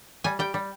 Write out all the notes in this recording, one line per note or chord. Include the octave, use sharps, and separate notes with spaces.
G3 G#5
G3 G5
G3